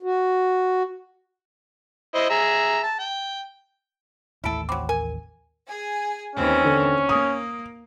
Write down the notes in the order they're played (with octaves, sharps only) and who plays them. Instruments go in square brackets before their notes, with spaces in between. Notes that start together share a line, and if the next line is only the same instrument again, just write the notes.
[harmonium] F#4
[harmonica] E4 C5 D#5
G#4 E5 A#5
A5
G5
[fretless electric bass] A1 D#2 A3 [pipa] E4 A4 [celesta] B5 D7
[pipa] F#3 C4 [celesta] B5 D6
[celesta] A#4 [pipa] G#5
[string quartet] G#4 G#5
[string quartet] D#2 E3 C4 [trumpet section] C#4
[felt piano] D3
[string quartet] A#3 [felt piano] D#6